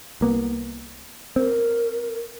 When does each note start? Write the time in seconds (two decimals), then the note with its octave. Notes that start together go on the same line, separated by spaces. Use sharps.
0.21 C2 A#3 B3
1.36 C4 A#4